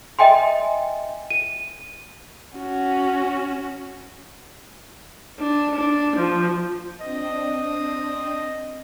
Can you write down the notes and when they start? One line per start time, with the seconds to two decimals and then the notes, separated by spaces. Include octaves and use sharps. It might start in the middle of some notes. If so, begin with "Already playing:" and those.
0.19 D#5 E5 G5 G#5 C6
1.30 D#7
2.58 C#4 F#4
5.39 D4
5.75 D4
6.16 F3
7.00 C4 D4 D#5